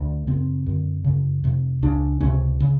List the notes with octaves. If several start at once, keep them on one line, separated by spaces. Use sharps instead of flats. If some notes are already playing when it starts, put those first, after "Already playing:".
Already playing: D2
F#2 C#3 C4
F#2 D3
F#2 C#3
F2 C3
C#2 C#3 D4
C#2 C3 C#4
C#3